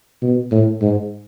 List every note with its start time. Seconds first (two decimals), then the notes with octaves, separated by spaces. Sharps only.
0.22 B2
0.52 A2
0.81 G#2